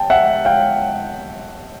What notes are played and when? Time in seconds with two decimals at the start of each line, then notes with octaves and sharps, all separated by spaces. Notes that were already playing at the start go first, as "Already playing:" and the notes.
Already playing: G5 A5
0.10 E5 F#5
0.45 F5 G5